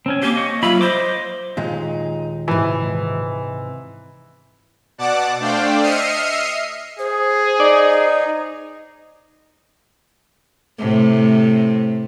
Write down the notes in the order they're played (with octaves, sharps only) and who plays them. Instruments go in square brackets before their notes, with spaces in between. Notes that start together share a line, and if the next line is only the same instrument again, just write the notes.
[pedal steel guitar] C4 C#4 G#5
[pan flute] A#3 [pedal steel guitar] G4 G#5 D6
[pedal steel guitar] D#5 C#6
[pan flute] F#3 [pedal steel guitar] F4 E5 B5
[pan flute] C5 [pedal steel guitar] D#5 C6 D6
[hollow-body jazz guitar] D#2 A#2 G#3 [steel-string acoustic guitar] D#4
[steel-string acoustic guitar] G#2 C3 [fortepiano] E3
[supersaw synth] B2 D5 F#5 A5 D6
A3 D4 C5 D5 F5 G5
D#5 E5 F6 C7 C#7 D#7
[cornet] G#4 [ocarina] C5
[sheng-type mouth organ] D#4 [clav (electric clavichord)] D5
[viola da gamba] A2 C3